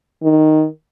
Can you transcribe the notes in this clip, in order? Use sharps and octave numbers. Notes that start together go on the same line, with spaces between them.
D#3